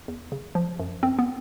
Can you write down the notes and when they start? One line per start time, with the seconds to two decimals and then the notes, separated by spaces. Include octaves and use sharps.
0.08 E2
0.32 C#3
0.55 F3
0.80 F#2
1.03 F#2 C4
1.19 B3